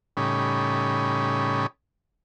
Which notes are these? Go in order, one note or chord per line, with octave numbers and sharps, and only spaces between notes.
A2 C#3 G3 C#4 D#4 B5